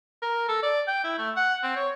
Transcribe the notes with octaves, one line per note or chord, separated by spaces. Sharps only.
A#4
A4
D5
G5
E4
A3
F#5
C4
C#5